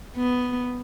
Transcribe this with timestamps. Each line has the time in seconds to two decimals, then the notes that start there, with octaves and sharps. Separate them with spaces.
0.16 B3